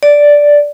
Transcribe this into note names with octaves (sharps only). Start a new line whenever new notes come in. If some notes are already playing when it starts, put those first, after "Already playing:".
D5